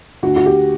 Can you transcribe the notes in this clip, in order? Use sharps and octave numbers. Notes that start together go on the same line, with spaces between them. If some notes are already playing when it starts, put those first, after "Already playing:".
D2 F#4
F#4
G4